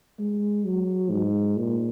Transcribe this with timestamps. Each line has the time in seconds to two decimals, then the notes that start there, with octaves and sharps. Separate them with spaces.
0.19 G#3
0.65 F#3
1.10 G#2
1.57 A#2